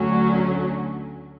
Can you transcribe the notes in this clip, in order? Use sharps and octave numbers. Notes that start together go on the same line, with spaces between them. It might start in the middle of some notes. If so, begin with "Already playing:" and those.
Already playing: D2 D3 F#3 A3 C#4